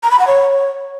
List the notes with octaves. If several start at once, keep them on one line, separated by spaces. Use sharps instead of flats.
A#5
B5
F#5
C#5